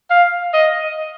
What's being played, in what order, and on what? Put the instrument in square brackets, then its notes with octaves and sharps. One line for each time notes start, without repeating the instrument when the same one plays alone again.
[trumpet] F5
D#5